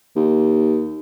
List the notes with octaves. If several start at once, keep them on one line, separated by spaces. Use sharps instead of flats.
D#2